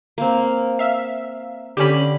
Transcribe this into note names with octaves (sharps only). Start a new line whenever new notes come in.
A#3 C4
E5 F5
D3 C#4 G4 B5